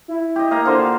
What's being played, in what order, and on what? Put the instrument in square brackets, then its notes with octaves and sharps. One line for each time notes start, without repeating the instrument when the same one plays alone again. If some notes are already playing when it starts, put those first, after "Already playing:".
[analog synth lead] E4
[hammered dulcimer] G4 D#5
A#3 D#5 F5
[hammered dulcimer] D3 F4 F5 [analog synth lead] C5